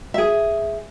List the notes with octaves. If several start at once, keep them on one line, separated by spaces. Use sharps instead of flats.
G#4 E5